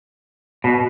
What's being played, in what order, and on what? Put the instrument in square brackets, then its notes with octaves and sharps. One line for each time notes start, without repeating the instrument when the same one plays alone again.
[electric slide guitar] B2